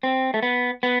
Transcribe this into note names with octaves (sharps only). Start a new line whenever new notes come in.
C4
A3
B3
B3